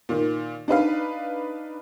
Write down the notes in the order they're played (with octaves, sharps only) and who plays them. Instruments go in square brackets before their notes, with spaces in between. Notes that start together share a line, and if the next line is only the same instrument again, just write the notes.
[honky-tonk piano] A#2 D#3
D4 D#4 B4 F5